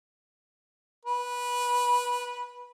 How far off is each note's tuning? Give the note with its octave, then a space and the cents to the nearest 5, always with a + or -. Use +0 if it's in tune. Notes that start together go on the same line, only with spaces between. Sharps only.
B4 -15